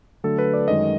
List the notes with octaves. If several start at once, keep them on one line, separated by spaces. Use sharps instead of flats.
D3 F#3 A3 A4
B4
D5
F#2 D#3 G#3 C#4 D#5